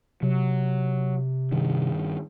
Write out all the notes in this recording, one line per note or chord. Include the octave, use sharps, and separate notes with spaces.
C3 F#3
G2 D#3